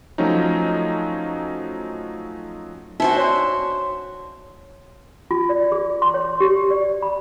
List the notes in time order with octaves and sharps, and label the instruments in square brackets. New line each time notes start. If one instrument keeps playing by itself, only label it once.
[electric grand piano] F3 F#3 A3 C#4 D#4
[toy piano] D4 D#4 [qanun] F#4 C5 E5
[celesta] C#5 C6 [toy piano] D5
[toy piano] F4
D5
G#4
C6
C#5
G4
D5
B5